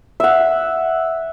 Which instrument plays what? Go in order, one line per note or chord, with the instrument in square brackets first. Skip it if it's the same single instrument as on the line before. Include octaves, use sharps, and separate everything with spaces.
[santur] E5 F#5